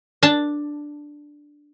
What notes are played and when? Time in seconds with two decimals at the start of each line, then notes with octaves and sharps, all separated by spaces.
0.23 D4 A5